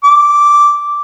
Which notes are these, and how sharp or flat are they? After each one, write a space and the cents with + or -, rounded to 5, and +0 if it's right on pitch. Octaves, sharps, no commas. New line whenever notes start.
D6 -5